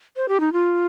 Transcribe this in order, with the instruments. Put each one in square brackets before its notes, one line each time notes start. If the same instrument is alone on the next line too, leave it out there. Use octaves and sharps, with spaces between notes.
[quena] C5
G4
D#4
F4